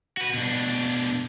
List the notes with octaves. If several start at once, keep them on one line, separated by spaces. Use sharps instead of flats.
F#4 B4
B2 D4